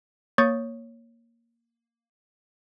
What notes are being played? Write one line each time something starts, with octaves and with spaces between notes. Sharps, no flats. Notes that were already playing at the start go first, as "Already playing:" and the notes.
A#3 C#5 C#6 D#6 G6 A6